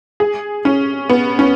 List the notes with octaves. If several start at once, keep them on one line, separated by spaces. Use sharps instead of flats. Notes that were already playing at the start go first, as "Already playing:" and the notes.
G#4
C#4
B3
C#4